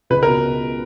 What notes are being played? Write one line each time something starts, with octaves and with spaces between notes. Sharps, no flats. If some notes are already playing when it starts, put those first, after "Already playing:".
C#2 B4
B2 A#4